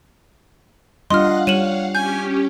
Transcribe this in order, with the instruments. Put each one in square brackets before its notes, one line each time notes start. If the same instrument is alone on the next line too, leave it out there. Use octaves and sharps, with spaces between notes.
[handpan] G3 D4 F4 [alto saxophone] D#5 [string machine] F5 F#5 [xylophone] C6 F6
[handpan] G3 [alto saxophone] C#5 [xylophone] D#7 E7 F#7
[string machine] C#4 G4 [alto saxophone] G#5 [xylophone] G6